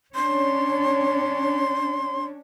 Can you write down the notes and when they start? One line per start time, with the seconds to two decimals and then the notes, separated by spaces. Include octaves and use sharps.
0.15 C#4 D4 C#5 C6